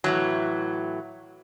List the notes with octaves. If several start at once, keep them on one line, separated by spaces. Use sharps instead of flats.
A2 E3 F#3